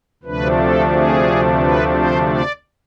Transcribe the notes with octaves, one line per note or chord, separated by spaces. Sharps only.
D2 C3 F3 A3 D4 B4
A4
G#4
B4
C5
D5